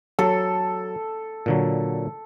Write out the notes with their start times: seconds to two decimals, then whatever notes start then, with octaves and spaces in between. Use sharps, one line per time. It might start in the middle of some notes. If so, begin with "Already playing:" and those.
0.19 F#3 A4
1.46 A#2 D3 F#3